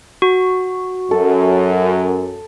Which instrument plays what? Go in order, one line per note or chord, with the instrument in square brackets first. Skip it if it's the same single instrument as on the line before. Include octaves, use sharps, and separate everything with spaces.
[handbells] F#4
[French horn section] F#2 [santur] A4